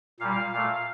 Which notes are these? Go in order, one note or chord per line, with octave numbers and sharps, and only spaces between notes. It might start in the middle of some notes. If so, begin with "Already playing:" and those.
A#2 G3 F5
A#2 A3